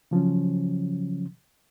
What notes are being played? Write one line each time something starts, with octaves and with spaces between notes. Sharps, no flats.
C#3 F3 F#3 C#4